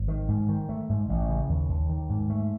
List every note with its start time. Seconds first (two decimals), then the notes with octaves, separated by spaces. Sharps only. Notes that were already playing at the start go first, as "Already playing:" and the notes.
Already playing: G#1
0.08 D#3
0.29 G#2
0.49 D#3
0.69 A3
0.89 G#2
1.09 A1
1.29 C#3
1.49 D#2
1.69 D#2
1.89 D#3
2.09 G#2
2.30 A3